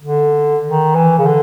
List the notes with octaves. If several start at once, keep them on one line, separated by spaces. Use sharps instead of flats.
D3
D#3
E3
C#3
D3